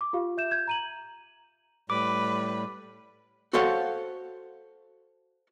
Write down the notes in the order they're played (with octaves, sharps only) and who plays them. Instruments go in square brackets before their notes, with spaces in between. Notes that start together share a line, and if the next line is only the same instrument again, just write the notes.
[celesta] D6
F4 G4 F5
E5 G6 E7
G6 G#6
A#5 D#7 F#7
[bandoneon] A2 G3 [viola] B4 [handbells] D6
[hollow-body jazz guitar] F#4 A4 C5 C#5 F5 F#5